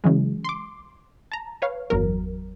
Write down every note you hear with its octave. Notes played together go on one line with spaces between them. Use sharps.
C#3 E3 F#3 G#3
C6 D6
A5 A#5
B4 C#5 F5
G1 E2 F#3 A#4